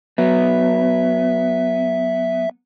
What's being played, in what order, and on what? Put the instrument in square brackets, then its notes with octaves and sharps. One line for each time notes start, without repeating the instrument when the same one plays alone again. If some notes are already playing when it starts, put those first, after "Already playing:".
[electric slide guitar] F#3 B3 [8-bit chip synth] E5